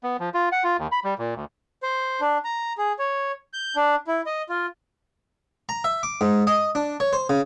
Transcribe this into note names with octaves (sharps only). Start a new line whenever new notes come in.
B3
F3
F4
F#5
F4
D#2
B5
G3
A#2
D2
C5
D4
A#5
G#4
C#5
G6
D4
E4
D#5
F4
A#5
E5
D6
G#2
D#5
D4
C#5
C5
C#3